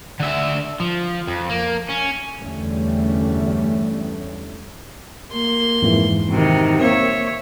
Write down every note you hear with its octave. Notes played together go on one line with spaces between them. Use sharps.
D3 E5
F3
F2
A#3
C#4
E2 G2 D3 G3 A3 C#4
A#3 C6
F2 G#2 E3
C3 D#3 F#4 G4
A#3 C4 C#5 E5